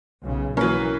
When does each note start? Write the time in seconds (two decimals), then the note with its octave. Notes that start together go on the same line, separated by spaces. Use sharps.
0.23 B1 C#3
0.57 E3 F#3 A#3 C#4 B4